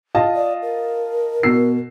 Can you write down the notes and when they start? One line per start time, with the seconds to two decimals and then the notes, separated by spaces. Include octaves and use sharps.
0.15 F4 D#5 A5
0.35 D5
0.62 A#4
1.43 B2 E6 C7